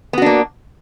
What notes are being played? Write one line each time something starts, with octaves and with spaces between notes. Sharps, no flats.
A#3 B3 D4 F#4